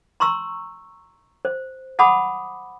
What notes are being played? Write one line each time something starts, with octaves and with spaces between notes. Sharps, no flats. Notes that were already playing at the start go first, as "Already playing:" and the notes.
A#5 C6 C#6 E6
C5
F#5 A5 B5 D6 D#6